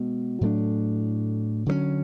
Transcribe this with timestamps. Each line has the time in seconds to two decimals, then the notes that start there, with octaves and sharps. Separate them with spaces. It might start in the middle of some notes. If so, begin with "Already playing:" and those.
Already playing: B2 G#3
0.41 A2 F#3 A3 D4
1.66 D3 F#3 A3 C#4